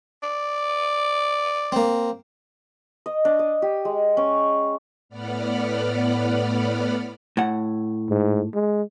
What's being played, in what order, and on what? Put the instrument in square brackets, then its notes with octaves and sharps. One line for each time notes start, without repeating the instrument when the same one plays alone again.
[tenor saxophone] D5
[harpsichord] A#3 C4
[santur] D#5
D4
D#5
G4
G#3
C#4
[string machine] A2 B3 D5 F#5 B5 F6
[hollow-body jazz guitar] A2 F#5
[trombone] G#2
G#3